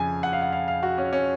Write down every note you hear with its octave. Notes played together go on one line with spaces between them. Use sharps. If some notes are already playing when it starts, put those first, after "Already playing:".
Already playing: F2 C#3 F3 G#5
F#5
F5
F#5
F5
F5
F#4
C#4
C#4